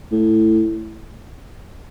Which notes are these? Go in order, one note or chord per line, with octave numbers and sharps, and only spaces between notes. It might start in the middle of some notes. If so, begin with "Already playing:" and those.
A2